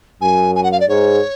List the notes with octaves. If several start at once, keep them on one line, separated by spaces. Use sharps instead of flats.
F#2 G#5
G#5
F#5
F5
D5
G#2 C#5